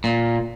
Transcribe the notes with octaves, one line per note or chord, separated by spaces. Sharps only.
A#2